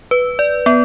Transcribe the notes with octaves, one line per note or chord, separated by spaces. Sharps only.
B4
D5
B3